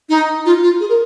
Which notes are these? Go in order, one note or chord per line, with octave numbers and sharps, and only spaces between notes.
D#4
F4
F4
G#4
A#4